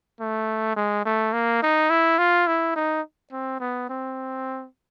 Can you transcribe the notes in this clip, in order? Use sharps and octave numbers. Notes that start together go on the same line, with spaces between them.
A3
G#3
A3
A#3
D#4
E4
F4
E4
D#4
C4
B3
C4